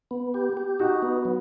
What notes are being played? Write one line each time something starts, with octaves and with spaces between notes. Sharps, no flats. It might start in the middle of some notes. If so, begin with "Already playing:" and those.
B3
G4
G4
D#4 F#4
B3
F#3